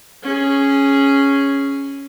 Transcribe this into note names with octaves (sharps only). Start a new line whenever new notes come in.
C#4 G#4